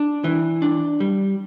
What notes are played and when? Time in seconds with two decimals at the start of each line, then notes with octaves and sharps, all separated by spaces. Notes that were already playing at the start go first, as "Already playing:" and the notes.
Already playing: D4
0.24 E3
0.62 D4
1.00 G3